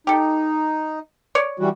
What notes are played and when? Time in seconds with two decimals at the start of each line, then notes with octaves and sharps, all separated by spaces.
0.07 D#4 G4 A4
1.35 C#5 D5
1.60 E3 G3 F#4